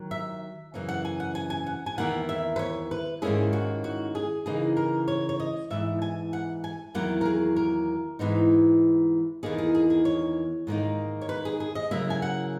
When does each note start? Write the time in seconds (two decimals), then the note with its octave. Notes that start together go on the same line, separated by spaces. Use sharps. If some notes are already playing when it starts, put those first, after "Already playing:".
Already playing: D#3 F#3
0.11 E5
0.74 F#2 C#3 E3 A#3 C#4
0.89 F#5
1.05 G#5
1.20 F#5
1.35 G#5
1.50 G#5
1.66 F#5
1.86 G#5
1.98 E2 D#3 A#3 E4 F#5
2.29 E5
2.56 B4
2.59 C#5
2.91 B4
3.22 G#2 D#3 A#3 C#4 E4 G#4
3.53 F#4
3.84 F#4
4.15 G#4
4.46 C#3 E3 A#3 D#4 G#4
4.77 A#4
5.08 C#5
5.29 C#5
5.40 D#5
5.70 G#2 E3 B3 E5
6.02 G#5
6.33 F#5
6.64 G#5
6.94 E2 D#3 F#3 A#3 E4 F#5
7.21 A#4
7.25 G#4
7.56 A#4
8.19 G#2 E3 B3 D#4
9.43 E2 D#3 A#3 D#4 G#4
9.58 G#4
9.75 G#4
9.90 G#4
10.05 C#5
10.67 G#2 D#3 A#3 D#4
11.21 C#5
11.29 B4
11.45 G#4
11.60 G#4
11.75 D#5
11.91 C#3 F#3 A#3 E4 E5
12.10 G#5
12.22 F#5